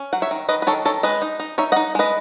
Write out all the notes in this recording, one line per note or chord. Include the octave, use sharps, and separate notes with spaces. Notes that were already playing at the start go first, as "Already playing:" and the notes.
Already playing: C#4
F#3 F#5
C#5 E5
D#3
D#3 B4 D#5
B4
D#3 A4 C#5
D#3 A4 C#5
G#3 B4 D#5
D#4
D#4
D#4 C#5 E5
D#5 F#5
D#4
G#3 B4 D#5